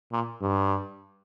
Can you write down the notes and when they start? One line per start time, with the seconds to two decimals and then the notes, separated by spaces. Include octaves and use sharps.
0.12 A#2
0.42 G2